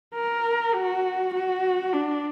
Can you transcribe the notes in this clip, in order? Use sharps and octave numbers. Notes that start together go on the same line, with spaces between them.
A#4
F#4
F#4
D4